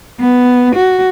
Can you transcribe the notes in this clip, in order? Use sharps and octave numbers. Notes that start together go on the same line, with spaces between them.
B3
F#4